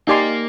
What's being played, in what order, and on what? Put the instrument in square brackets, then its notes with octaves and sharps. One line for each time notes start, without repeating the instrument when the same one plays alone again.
[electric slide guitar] A#3 [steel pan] D#4 G4 D5 G#5 C6